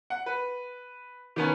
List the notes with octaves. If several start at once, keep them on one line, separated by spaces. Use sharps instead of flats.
F#5
B4
D#3 B3 C#4